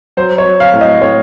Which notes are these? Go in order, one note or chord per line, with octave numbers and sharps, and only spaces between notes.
F#3 C5
C#5
F#3
F5
A2
D#5
A2 C#5